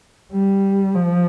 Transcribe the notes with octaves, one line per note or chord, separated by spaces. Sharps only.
G3
F3